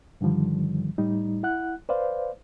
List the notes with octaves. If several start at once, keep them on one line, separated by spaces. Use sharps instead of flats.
G2 D3 D#3 F3 G3
A2 G3 D#4
E4 F#5 F#6
B4 C5 D5 F5